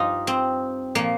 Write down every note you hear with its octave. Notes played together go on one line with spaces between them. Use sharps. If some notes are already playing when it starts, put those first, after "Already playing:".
Already playing: G2 F3 D#4 F4 G4
C4
A#2 F3 A#3